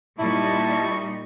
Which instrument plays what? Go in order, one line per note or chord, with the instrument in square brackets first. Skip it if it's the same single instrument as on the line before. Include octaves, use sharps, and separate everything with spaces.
[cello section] A#2 G3 D#4 [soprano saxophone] E4 [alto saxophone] A5 [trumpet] C#6